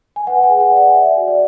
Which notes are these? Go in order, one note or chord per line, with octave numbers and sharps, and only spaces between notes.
G#5
B4 F#5
G#5
G#4
F#5
D5 F#5
C#5 E5
F#4
D5